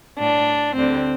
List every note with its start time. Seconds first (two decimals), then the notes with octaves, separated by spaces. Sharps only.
0.19 A2 G3 D4
0.76 D2 D3 G3 C4